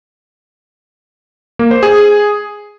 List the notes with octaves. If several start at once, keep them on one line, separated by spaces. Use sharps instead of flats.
A#3
C5
G#4